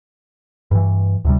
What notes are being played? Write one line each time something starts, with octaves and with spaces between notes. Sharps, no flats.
G2 E3
D2 C3 G3